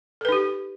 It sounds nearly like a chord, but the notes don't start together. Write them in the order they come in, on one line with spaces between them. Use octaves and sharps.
A4 B4 D#4 G4